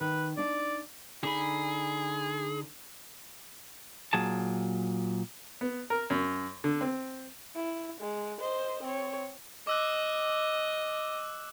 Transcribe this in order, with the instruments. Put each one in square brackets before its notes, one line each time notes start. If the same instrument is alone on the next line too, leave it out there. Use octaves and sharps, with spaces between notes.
[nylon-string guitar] D#3 [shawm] B4
[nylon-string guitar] D4 D#4 [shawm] D5
[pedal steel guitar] D3 D#4 B5 [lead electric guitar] G#4
[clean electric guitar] A#2 F#3 G#4 A5
[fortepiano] B3
A#4
F#2
D3
C4
[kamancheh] E4
G#3
C5 D#5
C4 C#5
[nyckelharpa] D#5 [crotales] D6 E6 F#6